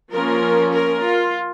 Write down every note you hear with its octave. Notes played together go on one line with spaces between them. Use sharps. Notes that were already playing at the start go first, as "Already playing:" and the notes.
F3 A#3 C#4 A#4
A#4
F4